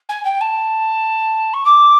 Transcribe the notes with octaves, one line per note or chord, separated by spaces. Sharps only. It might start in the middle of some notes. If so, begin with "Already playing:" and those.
G#5
G5
A5
C#6
D6